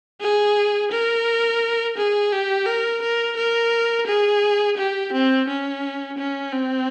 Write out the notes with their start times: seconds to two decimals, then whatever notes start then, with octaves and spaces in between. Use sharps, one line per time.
0.21 G#4
0.92 A#4
1.97 G#4
2.32 G4
2.67 A#4
3.02 A#4
3.37 A#4
4.07 G#4
4.77 G4
5.13 C4
5.48 C#4
6.18 C#4
6.52 C4